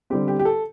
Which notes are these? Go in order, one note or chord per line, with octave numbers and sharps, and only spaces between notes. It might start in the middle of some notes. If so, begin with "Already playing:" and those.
D3 G3 C4 G4
G4
G4
A4